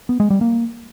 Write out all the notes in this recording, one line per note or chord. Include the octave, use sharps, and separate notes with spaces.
B3
G#3
G3
A#3